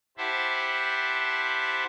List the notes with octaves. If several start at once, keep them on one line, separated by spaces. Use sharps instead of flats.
E4 G4 C5 E5 F#5 A5